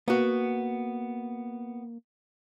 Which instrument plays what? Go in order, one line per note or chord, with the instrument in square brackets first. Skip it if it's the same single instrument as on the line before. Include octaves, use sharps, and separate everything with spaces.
[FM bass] A#3 [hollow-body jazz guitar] B3 F#4